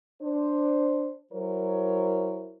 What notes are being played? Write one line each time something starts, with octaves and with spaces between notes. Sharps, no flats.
D4 C5
F#3 E4 A#4 C5 C#5